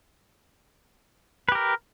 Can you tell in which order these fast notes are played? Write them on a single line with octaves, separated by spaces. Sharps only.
B4 G4 A#4